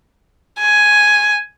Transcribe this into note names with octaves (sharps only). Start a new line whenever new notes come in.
G#5